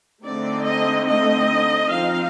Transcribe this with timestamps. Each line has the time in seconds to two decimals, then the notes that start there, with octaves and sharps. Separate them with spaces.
0.23 D3 A3 C4 D#4 D5
0.66 D#5
1.08 D#5
1.90 F3 C4 D#4 F5